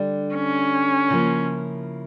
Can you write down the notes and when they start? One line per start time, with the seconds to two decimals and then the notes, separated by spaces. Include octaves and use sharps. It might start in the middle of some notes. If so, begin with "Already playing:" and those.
Already playing: D3 G3 D4
0.35 C#4
1.10 C#3 F3 A#3 E4